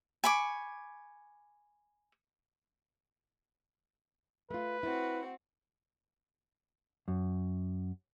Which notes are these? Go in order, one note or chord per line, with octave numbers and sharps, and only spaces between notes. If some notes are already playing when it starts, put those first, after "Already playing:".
G#5 B5 C#6 D6
A3 F4 B4
C4 E4 F#4
F#2